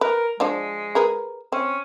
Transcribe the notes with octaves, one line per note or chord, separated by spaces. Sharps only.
A#4 B4
F3 G#3 D4 C5
G#4 A#4 B4
C4 C#4